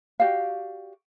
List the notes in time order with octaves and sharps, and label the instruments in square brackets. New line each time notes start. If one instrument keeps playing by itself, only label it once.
[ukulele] F#4 G4 D5 F5